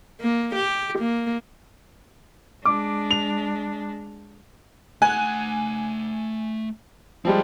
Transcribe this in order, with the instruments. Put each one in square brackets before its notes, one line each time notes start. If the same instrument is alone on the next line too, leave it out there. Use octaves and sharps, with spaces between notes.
[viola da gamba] A#3
G4
A#3
[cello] G#3 D4 [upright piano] D6
[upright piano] F7
[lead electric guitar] A3 F#5 [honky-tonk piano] G#5 F#6
[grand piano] F3 G3 G#3 [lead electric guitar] C4 D#5